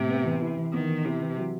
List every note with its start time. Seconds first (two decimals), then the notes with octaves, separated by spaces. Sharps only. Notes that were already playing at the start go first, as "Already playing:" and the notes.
Already playing: A2 C3
0.09 B3
0.24 E3
0.41 E4
0.56 E3
0.73 D#3 B3
0.89 E3
1.05 C3 E4
1.21 E3
1.38 F#3